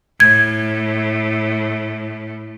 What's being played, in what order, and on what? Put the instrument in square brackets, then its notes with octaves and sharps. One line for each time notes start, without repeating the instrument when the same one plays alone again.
[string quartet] A2 [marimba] G#6